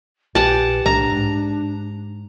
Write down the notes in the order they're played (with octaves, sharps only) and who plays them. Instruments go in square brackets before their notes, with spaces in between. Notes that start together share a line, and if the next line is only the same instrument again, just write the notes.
[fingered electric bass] A#1 [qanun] G4 F#5 G#5 [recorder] B4 [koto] A5
[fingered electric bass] B1 A2 [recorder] D4 [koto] A#5
[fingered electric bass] G#2